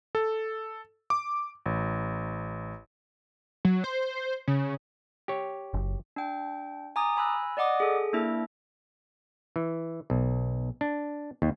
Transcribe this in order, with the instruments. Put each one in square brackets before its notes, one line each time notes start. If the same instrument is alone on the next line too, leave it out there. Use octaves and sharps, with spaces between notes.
[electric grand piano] A4
D6
A1
[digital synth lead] F#3
C5
C#3
[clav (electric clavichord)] G4 C#5
[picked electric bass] F#1
[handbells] D4 G5
G#5 A#5 D6 D#6 G#6 A6
G#5 B5 E6 F#6 A#6
D5 D#5 F#5 D6 D#6
G#4 A4
A#3 D4 E4 E5
[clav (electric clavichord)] E3
B1
D4
D#2